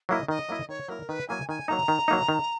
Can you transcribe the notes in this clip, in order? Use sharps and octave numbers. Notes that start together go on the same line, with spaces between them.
F#3 A#3 E4 D#5
D#3 D#5
F#3 A#3 E4
D#3 C#5
F#3 A#3 E4 A#4
D#3 B4
F#3 A#3 E4 G#5
D#3 G#5
F#3 A#3 D#4 A#5
D#3
F#3 A#3 D#4
D#3